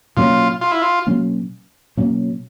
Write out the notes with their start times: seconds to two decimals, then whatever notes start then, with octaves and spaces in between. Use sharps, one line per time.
0.17 B2 F#3 A#3 C#4 F4
0.61 F4
0.72 E4
0.82 F4
1.07 B2 F#3 A#3 C#4
1.97 B2 F#3 A#3 C#4